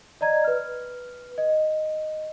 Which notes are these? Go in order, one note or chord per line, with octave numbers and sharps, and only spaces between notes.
D5 D#5 A#5 G#6
B4 F6
D#5